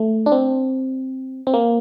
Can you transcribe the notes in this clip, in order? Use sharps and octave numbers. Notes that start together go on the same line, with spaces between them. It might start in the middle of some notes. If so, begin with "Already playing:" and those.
Already playing: A3
D4
C4
C4
A#3